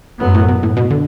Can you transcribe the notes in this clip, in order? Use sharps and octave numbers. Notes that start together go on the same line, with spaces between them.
F#2 A2 F#3 B3
A2
B2
A2
B2
D3